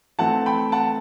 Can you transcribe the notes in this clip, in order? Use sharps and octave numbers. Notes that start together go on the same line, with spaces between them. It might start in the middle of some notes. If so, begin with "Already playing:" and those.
E3 A3 C4 F#5 A5
G5 B5
F#5 A5